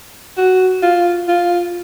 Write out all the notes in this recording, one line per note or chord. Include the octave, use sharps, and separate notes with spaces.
F#4
F4
F4